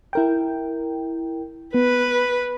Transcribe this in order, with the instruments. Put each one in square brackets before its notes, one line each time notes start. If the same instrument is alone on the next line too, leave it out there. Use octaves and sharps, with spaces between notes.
[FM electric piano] E4 A#4 G5
[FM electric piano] B3 [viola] B4